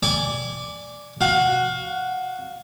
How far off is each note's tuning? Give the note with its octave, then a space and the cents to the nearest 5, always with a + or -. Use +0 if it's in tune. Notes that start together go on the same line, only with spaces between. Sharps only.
D5 +0 G#5 +0 D6 -45
F#4 +0 F5 +20